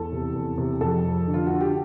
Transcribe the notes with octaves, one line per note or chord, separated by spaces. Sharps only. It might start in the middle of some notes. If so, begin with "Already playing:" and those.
Already playing: E2 A4
C3
E2
C3
F2 A4
F2
D3
F4
D3 F#4
G4